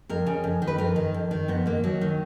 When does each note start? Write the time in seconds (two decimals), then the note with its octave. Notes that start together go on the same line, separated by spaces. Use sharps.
0.09 F2 A#4
0.26 C#3
0.44 F2
0.62 D#3
0.67 B4
0.78 F2 A#4
0.96 D#3
1.14 F2
1.31 D#3
1.48 F2 B3
1.66 D#3 A#3
1.83 D#2 F#3
2.01 D#3